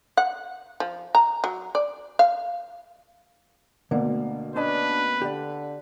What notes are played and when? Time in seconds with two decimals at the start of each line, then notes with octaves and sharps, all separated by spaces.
0.17 F#5
0.80 F3
1.15 A#5
1.44 F#3
1.75 D5
2.19 F5
3.91 D2 B2 D3 A#3
4.56 C#4 D4 B4 D#5 A5
5.22 D3 G4 D5